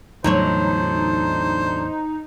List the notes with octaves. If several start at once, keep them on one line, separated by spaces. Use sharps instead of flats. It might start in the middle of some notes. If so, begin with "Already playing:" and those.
E2 A2 D3 F#3 D#4 C5 C#5